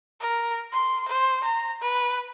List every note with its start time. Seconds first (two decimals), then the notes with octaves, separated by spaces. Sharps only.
0.20 A#4
0.72 C6
1.09 C5
1.44 A#5
1.82 B4